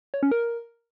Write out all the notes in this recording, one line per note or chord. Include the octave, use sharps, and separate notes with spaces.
C#5
C#4
A#4